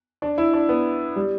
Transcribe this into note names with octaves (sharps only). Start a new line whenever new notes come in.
D4
E4
D4
B3
G3